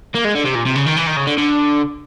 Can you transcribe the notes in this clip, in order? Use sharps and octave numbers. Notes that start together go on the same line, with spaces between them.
A#3
G#3
D3
C3
A#2
C3
C#3
D#3
E3
D#3
C#3
D3
D3